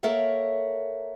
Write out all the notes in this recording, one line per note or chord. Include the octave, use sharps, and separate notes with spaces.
A#3 A4 A#4 C#5 E5 F#5